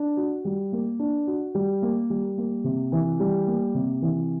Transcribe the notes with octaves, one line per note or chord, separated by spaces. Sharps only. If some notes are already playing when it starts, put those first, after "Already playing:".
Already playing: D4
F#4
G3
A#3
D4
F#4
G3
A#3
G3
A#3
C3
E3
G3
A#3
C3
E3